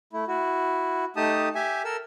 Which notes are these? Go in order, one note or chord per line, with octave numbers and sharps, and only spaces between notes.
A3 E4
E4 F#4
A3 D#4 G4 A5 D#6
G4 E5 G#5
A4 A#4 E6